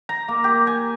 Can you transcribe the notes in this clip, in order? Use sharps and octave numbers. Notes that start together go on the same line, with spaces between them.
A#5
A#3
G4
G#5